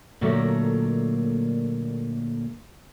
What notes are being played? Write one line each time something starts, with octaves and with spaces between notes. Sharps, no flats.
A#2 D3 F#3 A3 A#3